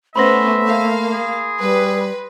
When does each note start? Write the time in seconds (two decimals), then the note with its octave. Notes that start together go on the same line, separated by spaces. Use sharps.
0.16 A3 B3 C#4 C5 E5 B5 C6 A#6
0.67 A#3 F5
1.13 G#4
1.61 G3 B4